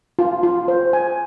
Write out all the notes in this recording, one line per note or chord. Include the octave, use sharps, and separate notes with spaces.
F4
F4
C5
G#5